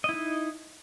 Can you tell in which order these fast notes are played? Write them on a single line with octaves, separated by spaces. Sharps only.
D#5 E4 D#4